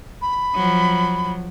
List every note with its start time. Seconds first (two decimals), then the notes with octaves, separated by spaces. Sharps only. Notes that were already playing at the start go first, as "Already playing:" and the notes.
0.22 B5
0.55 F3 F#3